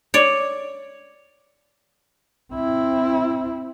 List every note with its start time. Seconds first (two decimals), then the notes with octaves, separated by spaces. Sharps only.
0.14 C#5 D5
2.53 C4 E4